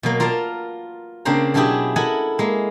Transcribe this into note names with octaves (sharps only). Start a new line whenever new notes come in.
B2 F#3 A#3
F4 A#4 D5 F5 A5
C#3 A#3 C4 D4 C5 A#5
B2 F#3 D4 E4 G4 G#4
E4 A4 A#4 D#5 F#5 G#5
G#3 A#3